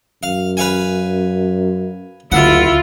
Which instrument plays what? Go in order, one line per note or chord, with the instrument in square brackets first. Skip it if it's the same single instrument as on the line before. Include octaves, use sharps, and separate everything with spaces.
[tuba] F#2 [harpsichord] F5
[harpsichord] B4 F5 G#5
[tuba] F#1 [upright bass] D2 [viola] E4 F4 [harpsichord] F#5